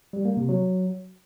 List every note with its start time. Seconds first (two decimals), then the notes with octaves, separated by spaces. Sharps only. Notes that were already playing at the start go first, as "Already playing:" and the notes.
0.13 G3
0.25 A#3
0.37 C3
0.49 F#3